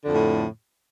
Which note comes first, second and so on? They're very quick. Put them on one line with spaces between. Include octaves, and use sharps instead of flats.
D3 F2 A2